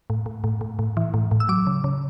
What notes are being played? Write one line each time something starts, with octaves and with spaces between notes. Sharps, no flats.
A2
A2
A2
A2
A2
E3
A2
A2
E6
F#3 D6
C#3
C#3